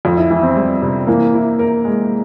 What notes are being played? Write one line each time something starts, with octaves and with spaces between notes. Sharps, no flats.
F2 F4
E4
E3 E4
C4
G3
C3
E3 A#3
E4
A#4
G#3